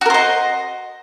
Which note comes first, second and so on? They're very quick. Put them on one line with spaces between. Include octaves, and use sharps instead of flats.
F#4 A#4 C5 D#5